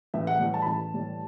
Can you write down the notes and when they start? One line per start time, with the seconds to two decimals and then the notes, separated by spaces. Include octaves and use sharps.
0.14 A1 E5
0.27 F#5
0.40 A2 E3 G3
0.54 A5
0.62 B5
0.66 A1 A5
0.93 A2 E3 G3